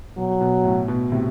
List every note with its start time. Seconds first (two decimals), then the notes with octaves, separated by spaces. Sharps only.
0.17 B2 F#3
0.41 B2
0.64 A2
0.88 B2
1.12 A2 C3